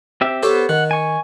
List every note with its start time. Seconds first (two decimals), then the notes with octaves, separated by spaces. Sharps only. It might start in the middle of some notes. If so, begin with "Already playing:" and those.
0.21 C4 G4 E5
0.43 B3 G4 A4 C5 C#5
0.69 D#3 F#5
0.91 G#5 C#6